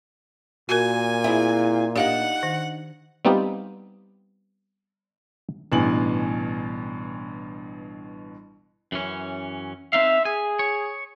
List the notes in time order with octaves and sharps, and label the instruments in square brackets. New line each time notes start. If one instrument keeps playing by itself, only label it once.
[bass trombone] A#2 [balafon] F#4 A#4 [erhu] G#5
[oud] C4 E4 G#4
[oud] D4 D#4 [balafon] G4 F5 [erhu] F#5
[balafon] D#3
[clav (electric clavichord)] G3 B3 C4 D#4 F4 G4
[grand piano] A1 G2 B2 G#5 F#7
[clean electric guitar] F#2 E3 C#4
[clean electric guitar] C4 D#4 F5 [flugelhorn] E5
[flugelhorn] G#4 [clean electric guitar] G#5
[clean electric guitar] C#5